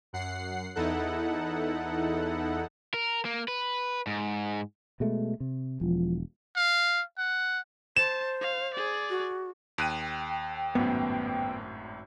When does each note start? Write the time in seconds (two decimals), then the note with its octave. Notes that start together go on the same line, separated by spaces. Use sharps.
0.13 F#2 F#5 C7
0.75 E2 D#4 E4 A4 F#5
2.94 A#4
3.25 A#3
3.48 B4
4.07 G#2
5.00 B2 G#3 A3
5.40 C3
5.81 E1 F3
6.56 F5
7.18 F#5
7.97 C5 A5 E7
8.41 F5
8.74 G#4 D5
9.09 F#4
9.78 D#2 G5 F#6 D#7
10.75 G#1 F#2 A2 B3